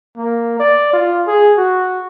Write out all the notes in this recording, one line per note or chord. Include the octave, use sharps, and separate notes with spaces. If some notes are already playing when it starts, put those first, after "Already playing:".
A#3
D5
F4
G#4
F#4